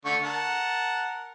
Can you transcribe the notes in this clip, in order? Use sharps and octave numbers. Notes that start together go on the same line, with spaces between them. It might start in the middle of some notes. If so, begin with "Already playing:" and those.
D3 A3 C#6
A#4 F#5 A5